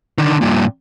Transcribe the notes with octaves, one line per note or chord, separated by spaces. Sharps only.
D3 D#3
G2 A#2